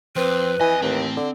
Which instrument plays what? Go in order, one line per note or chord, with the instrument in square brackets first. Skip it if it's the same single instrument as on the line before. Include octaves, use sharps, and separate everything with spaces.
[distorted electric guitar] F2 [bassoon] C4 [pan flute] B4
[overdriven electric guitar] F2 G#5 [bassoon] E3 [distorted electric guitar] D#5
[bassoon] D#2 [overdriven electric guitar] A2 E3 [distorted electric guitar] C4
[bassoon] D3